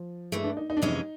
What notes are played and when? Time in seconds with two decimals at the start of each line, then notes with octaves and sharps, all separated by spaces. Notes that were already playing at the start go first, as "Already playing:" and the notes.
Already playing: F3
0.32 G2 E3 G#3 A3
0.44 D4
0.57 D#4
0.70 D#4
0.77 D4
0.82 F2 C3 E3 G#3 C#4 D#4